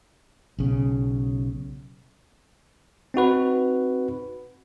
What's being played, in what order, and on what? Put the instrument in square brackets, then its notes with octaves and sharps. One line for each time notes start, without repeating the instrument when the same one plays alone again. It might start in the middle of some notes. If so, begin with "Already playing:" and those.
[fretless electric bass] B1 C#3
[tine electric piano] C4 D#4 F#4 B4